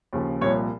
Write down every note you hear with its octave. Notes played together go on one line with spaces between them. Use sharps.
D#2 C#3 F3
C2 A#2 F3 C#5